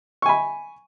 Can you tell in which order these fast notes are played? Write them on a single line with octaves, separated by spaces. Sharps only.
C#6 G#5 B5